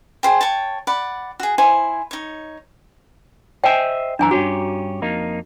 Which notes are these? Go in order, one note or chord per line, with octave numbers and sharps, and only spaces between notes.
G#4 C5 G5
C#5 G5 A5
D5 F#5 B5
F#4 G#4
E4 C5 G#5
D#4 C#5
C5 D#5 E5 G5 G#5
F#2 E3 D4 G#5 A#5
G2 C#4 F#4 G4
F2 A#3 D#4